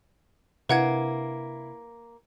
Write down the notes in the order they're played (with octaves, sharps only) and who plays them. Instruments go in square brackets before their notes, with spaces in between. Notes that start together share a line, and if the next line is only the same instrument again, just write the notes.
[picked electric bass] C3 D4 [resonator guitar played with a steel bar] A#3 [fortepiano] E4 [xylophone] B4 F#5 G#6